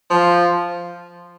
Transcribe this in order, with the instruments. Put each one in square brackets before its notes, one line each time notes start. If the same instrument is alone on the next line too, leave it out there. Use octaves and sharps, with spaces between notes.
[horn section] F3